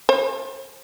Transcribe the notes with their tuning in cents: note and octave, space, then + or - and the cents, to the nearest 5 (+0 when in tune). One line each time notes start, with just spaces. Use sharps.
C5 +45